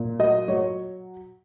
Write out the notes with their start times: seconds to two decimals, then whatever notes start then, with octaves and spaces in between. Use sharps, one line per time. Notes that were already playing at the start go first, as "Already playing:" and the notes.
Already playing: A#2
0.19 F#3 D#5
0.48 F#3 C#5